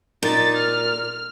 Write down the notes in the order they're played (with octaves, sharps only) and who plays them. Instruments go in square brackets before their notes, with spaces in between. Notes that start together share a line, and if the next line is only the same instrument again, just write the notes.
[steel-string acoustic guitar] A#2 [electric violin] D#4 A6
[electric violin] F6